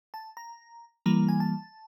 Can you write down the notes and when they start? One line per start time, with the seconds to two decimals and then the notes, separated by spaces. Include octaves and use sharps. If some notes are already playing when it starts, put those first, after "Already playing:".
0.14 A5
0.37 A#5
1.06 E3 G3 A#3 A#5
1.29 G#5
1.40 A5